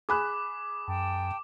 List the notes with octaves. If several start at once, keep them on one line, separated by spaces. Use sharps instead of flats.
G#4 B5 D6 F#6
F#2 G5 A5